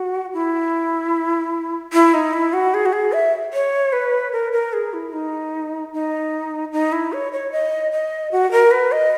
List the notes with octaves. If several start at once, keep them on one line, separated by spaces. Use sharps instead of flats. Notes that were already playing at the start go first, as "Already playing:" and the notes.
Already playing: F#4
E4
E4
D#4
E4
F#4
G#4
F#4
G#4
E5
C#5
B4
A#4
A#4
G#4
E4
D#4
D#4
D#4
E4
C#5
C#5
D#5
D#5
F#4
A#4
B4
D#5